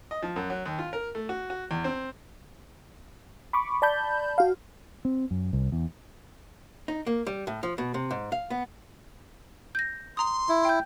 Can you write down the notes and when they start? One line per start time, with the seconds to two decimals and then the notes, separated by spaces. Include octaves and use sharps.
0.11 D#5
0.23 F3
0.36 F#2
0.50 F#3
0.65 D#2
0.79 F4
0.93 A#4
1.15 A3
1.29 F#4
1.50 F#4
1.71 E2
1.84 C4
3.53 B5 C#6 D6
3.82 D5 A5 B5 G6
4.38 F#4 F5
5.05 C4
5.31 F#2
5.53 C2
5.72 E2
6.88 D#4
7.07 A#3
7.27 G3
7.47 A2
7.63 F3
7.78 B2
7.94 C3
8.11 G#2
8.32 F5
8.50 B3
9.75 G6 A#6
10.17 A#5 C6 D#6
10.49 E4
10.65 G5 G6